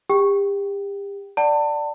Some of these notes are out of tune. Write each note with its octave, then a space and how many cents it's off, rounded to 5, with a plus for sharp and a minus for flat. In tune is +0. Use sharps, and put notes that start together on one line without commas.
G4 +35 G5 -10
D5 +0 F#5 +20 A5 +30